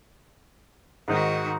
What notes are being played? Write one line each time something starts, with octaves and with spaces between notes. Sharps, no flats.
G#2 D#3 D#4 F#4